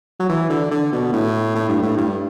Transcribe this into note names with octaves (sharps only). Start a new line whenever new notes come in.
F#3
E3
D3
D3
B2
A2
A2
G2
A2
G2